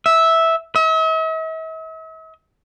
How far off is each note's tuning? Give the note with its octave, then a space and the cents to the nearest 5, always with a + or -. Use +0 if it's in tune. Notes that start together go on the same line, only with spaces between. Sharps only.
E5 -10
E5 -45